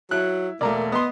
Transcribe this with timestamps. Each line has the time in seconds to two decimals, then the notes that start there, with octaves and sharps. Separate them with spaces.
0.11 F#3 E4 F#6
0.61 E1 A3 A#3 D5 A#5
0.92 B3 D#5 C6